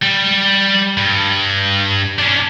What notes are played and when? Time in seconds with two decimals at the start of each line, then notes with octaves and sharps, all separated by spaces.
0.02 G3
0.97 G2
2.19 C#4 D4